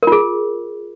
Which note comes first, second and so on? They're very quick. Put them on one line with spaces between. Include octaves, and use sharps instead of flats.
A#4 F4 G#4